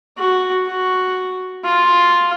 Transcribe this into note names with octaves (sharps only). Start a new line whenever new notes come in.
F#4
F#4
F4